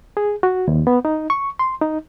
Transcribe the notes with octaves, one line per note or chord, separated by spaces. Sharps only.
G#4
F#4
D#2
B3
D#4
C#6
C6
D#4